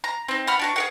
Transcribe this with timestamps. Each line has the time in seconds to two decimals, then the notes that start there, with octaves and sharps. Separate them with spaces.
0.04 A#5
0.28 C4 D#4
0.47 F#5 B5 F6
0.59 D4 F#4 A#5
0.76 G#4 A#4 F#5